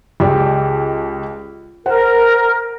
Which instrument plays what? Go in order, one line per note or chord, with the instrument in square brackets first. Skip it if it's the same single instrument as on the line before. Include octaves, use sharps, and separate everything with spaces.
[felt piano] C#2 G4 D5
[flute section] A#4 [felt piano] C5 F#5